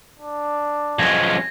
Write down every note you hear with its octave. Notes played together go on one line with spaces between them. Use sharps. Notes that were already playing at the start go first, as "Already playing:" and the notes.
D4
B1 F3 G#3 C#4 G#6 A#6